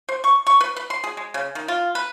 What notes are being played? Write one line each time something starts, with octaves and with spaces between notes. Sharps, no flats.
C5
C#6
C#6
B4
B4
C6
G#4
G#3
C#3
D#3
F4
B4